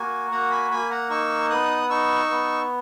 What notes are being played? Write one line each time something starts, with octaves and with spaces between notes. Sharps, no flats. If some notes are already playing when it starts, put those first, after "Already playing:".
Already playing: A#3 F#4 G#5
A#3 F#5 A#5
G#5 B5
A#3 G#5 B5
F#5 A#5
D#4 C#6 E6
B3 D#6 F#6
D#4 C#6 E6
B3